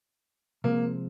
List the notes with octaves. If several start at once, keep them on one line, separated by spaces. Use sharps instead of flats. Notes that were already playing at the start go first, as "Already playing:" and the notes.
C3 F3 G#3 A#3 C4